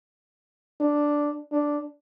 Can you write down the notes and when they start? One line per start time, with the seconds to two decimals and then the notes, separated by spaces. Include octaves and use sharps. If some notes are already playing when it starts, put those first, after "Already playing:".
0.80 D4
1.52 D4